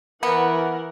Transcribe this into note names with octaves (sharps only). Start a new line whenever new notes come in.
E3 B3 A#4 F#5